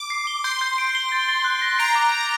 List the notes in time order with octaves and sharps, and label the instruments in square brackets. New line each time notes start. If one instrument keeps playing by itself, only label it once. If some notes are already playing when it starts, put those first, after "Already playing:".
Already playing: [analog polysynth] D6
[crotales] C7
G7
[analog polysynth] C6 [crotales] G6
[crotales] G6
D7
G7
A6
A6
F#6
A#6
[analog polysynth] A#5 [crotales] D7
[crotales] D6
D7